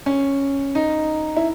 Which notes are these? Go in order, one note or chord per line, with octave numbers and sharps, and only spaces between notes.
C#4
D#4
E4